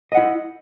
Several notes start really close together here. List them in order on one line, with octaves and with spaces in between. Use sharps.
D#5 F#5 E4